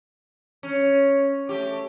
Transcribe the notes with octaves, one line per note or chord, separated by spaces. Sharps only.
C#4
A3 G4